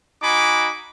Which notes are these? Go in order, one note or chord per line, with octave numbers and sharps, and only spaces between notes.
D#4 F#4 G#5 B5 D6